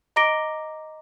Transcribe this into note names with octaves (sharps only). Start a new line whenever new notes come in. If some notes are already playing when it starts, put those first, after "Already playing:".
D#5 A#5 D6 A#6 D7 G7